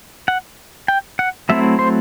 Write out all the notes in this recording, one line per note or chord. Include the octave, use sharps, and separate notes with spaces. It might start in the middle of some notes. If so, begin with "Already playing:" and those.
F#5
G5
F#5
F#3 A3 C4 E4 E5
C5